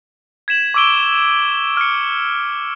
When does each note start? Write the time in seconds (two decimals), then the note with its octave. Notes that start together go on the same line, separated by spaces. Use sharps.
0.48 G#6 B6 E7 F#7
0.74 C#6 D6 E6 D7 G7
1.77 F6 C#7